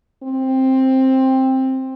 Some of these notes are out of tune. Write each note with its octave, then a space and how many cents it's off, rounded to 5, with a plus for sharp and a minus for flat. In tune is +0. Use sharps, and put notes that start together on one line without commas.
C4 +10